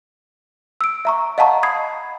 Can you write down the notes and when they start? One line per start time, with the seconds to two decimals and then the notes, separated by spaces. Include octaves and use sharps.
0.81 E6 D7
1.05 E5 A#5 C#6
1.38 D#5 F5 F#5 A5 A#5 C#6
1.63 B5 D#6 G#6 C7